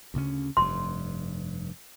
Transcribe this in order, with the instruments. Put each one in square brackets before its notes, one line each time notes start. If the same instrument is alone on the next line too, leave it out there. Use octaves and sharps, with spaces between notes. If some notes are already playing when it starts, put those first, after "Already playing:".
[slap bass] D2 C#3 C#4
[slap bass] F1 G2 [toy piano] C6